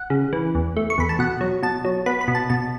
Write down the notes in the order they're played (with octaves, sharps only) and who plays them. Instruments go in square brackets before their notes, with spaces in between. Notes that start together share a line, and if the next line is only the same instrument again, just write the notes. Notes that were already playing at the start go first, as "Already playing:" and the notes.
Already playing: [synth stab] F#5
C#3
E3
E2
A3
C#6
E2 B5
A5
B2 F#5
F#3
B2 A5
F#3
B3 B5
B5
B2
A5
B2 A5